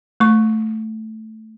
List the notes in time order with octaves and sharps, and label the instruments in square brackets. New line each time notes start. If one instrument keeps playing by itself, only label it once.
[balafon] A3 C#6